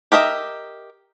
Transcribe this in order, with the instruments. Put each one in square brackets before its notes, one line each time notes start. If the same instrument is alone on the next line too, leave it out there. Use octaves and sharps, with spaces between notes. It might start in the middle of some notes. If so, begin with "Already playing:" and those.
[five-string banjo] G4 A#4 D#5 E5